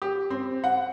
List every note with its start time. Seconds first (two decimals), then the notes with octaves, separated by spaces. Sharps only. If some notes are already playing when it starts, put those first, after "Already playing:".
0.02 G4
0.30 C4
0.64 F#5